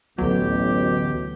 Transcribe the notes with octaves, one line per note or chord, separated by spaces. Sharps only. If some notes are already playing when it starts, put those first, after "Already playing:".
A1 D2 B2 F#3 G4